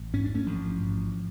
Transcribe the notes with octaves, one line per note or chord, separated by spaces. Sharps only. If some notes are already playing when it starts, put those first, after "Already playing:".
Already playing: A1
G#2 C#4
D4
A3 C#4
A1 F3
G#2